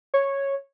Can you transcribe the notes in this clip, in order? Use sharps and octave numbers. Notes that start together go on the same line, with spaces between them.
C#5